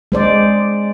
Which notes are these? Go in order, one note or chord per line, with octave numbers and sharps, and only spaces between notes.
G#3 C5 D5